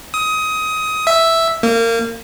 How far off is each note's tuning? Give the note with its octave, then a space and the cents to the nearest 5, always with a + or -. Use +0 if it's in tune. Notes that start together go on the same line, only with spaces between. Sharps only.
D#6 +20
E5 +0
A#3 -25